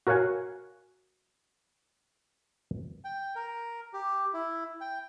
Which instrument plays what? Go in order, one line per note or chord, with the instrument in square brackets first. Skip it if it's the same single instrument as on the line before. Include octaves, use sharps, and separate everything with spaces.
[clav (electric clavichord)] F#4 A#4 C#5 F5 F#5 G#5
[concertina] G5
A#4
G4
E4
G5